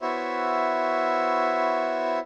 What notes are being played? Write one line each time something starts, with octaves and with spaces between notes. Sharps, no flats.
B3 E4 F#4 C5 C#5 E5